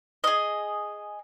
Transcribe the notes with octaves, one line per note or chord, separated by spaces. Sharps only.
G#4 D#5